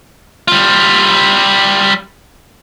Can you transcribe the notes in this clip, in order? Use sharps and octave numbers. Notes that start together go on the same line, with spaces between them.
G3 F4